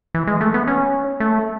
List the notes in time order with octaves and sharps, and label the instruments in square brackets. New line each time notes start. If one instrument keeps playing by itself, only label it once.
[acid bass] E3
G#3
A3
B3
C#4
A3